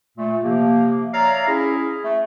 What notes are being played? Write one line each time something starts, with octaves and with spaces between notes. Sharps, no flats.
A#2 A3
C3 F3 A#3
C#5 D5 E5 F5 A#5
C#4 E4 G#4
A3